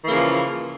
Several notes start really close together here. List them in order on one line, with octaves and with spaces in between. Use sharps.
E3 A#3 C#3 F3